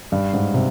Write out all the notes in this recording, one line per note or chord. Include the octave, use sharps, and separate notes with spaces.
G2
G#2
C3